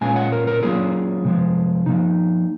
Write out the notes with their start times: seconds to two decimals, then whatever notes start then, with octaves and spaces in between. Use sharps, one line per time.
0.01 A#2 G#3 C#4 F4 G#5
0.16 F#5
0.32 A#4
0.47 A#4
0.63 F#3 A#3 C#4 F4 G#4
1.25 C3 F3 G#3
1.86 F3 A#3 D#4